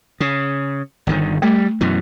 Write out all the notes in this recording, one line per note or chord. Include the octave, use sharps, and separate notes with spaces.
C#3
G1 D3 D#3
G3 A3
F#2 B2 E3